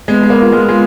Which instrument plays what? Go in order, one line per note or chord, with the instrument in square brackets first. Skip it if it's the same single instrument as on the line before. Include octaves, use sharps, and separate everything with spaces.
[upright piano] G#3 [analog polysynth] B3
[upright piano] G#3
A#3
[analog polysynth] F4
[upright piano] G#3
G#3